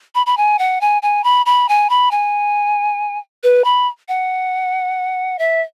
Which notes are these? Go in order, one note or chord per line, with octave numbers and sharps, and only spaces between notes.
B5
B5
G#5
F#5
G#5
G#5
B5
B5
G#5
B5
G#5
B4
B5
F#5
E5